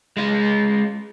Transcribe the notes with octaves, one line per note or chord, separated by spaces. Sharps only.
G#3 F4